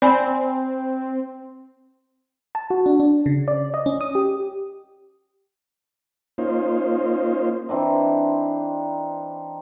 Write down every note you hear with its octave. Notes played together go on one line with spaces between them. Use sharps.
C4 D5 G#5 B5
A5
F#4
D4
D4
C#3
D5
D#5
C#4
D#6
G4
A#3 C#4 D#4 F4 C5
E3 C4 D4 D#4